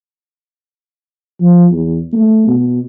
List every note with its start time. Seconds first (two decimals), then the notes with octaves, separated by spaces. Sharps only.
1.41 F3
1.71 E2
2.13 A3
2.47 B2